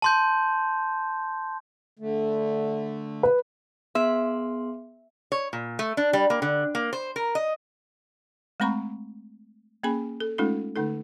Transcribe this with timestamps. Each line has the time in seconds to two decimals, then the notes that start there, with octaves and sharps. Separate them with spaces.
0.02 A5 C6 G6
1.99 D3 A3
3.23 B4
3.95 B3 G#4 E5 C6
5.32 C#5
5.53 A#2
5.79 A3
5.97 D4
6.13 G3
6.30 A#3
6.42 D3
6.75 A#3
6.93 C5
7.16 A#4
7.35 D#5
8.60 G#3 A3 C4 A#5 B5 C#6
9.83 A#3 C#4 G#4 G#5 B5
10.20 A4
10.38 G#3 A3 C#4 D#4 F4 A4
10.75 D3 A3 D#4 A4